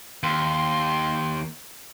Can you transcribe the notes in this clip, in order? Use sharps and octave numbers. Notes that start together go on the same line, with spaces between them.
D#2 C6